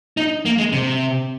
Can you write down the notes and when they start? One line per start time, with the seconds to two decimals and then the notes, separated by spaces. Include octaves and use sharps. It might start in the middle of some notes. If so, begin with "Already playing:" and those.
0.17 D#4
0.45 A#3
0.58 G#3
0.72 C3